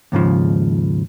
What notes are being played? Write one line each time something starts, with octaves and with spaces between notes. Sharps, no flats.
D#2 G#2 C#3 F3